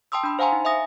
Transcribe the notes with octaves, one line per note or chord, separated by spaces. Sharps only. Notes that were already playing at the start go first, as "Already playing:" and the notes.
G5 A5 C6 D#6 E6
D4 B5
C5 F5 F#5 G#5 A#5 C6
D#4
E5 G#5 D#6 A#6